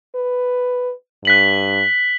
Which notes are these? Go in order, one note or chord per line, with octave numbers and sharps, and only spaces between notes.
B4
G2 F#6 B6 F#7